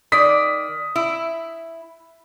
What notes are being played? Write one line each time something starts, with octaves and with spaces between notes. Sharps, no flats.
D#3 D5 D#6 B6
E4